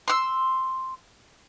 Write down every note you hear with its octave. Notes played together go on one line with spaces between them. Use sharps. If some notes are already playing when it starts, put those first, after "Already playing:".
C6 E6